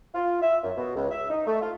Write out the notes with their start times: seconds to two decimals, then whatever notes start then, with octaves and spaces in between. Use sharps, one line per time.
0.15 F4
0.42 E5
0.64 F#2
0.77 B2
0.96 C#2
1.11 E5
1.30 D#4
1.47 A3
1.62 F4